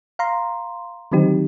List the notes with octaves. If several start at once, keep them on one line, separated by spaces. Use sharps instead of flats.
F5 A#5 C6
D3 D#3 F#3 C4 D#4 G4